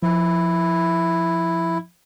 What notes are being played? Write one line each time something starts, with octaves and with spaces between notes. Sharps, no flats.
F3 E4